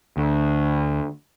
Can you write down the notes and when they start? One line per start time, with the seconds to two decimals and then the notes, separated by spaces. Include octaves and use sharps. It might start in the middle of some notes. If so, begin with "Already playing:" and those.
0.17 D2